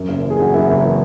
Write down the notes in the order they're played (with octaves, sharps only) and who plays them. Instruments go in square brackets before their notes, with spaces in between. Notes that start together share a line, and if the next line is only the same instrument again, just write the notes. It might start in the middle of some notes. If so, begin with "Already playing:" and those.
Already playing: [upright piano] F#2
F#1
E3
G#4
F#1 F#4
F#2 E4
F#1
E3